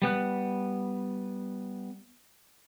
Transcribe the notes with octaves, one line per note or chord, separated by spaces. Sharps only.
G3 B3 F#6